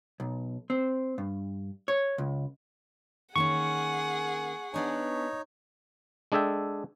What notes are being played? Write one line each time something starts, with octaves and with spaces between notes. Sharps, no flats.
B1
C4
G2
C#5
C#2
D#3 A#3 C#4 G#4 F#5 C#6
B3 D4 D#4 C#5 G#5
G#3 D4 G#4 A4 E5 G5